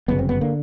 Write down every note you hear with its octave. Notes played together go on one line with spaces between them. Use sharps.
G1 F#2 C#3 B3
C4
B3
D3 A#3